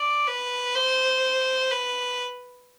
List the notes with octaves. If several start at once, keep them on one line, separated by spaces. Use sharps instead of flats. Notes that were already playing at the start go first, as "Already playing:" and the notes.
Already playing: D5
B4
C5
B4